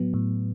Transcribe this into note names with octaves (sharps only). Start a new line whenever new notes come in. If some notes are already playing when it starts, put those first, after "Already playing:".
Already playing: A2 F#3 B3
A2